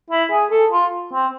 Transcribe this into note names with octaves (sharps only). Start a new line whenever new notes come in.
E4
G#4
A4
F4
C4